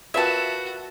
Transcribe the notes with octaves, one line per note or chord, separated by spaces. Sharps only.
F4 F#4 A#4 B4 E5 A5